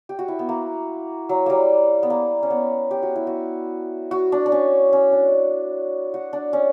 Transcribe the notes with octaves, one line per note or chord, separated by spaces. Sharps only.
G4
F#4
E4
B3
A#3
F#3
G3 A#3
B3
A#3
C#4
B3
G4
F#4
E4
F#4
F#4
D4
D4
C#4
C#4
D4
F#4
D4
C#4